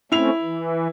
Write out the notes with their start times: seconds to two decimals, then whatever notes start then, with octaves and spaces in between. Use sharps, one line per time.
0.12 A3 C4 C#4 E4 F7
0.41 E3